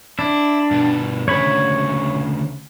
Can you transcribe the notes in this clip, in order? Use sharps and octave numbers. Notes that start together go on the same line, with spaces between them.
D4 E4
G2 B2
D2 C#3 C#5 B5